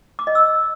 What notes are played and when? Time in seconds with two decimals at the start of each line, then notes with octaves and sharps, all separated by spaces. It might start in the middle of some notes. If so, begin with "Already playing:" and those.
0.19 D6
0.27 D#5
0.35 E6